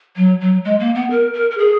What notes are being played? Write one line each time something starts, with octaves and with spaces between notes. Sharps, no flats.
F#3
F#3
G#3
A#3
B3
A#4
A#4
A#4
G#4